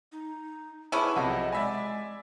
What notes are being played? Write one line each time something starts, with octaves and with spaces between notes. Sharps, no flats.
D#4
B3 C#4 E4 G#4 G#5 A5 C#6 D6
B1 C3 F3 G#4 D#5 F#5 A5
G#3 D5 E5 G#5 B5